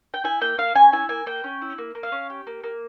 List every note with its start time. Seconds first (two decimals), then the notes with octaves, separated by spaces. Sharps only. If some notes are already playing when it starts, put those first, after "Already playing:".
0.14 G5
0.24 E4 G#5
0.41 A#3 G5
0.58 A#3 F5
0.75 C#4 G#5
0.92 E4 G#5
1.09 A#3 G#5
1.26 A#3 G5
1.44 C#4
1.62 E4
1.78 A#3
1.95 A#3
2.03 F5
2.12 C#4
2.30 G4
2.47 A#3
2.64 A#3